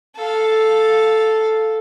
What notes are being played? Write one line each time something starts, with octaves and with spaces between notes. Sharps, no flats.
A4 F5